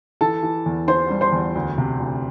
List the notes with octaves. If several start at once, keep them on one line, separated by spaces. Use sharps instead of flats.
E3 A4 A5
E3
E2
E3 C5 C6
G3
C5 C6
E2
D2
C3
D2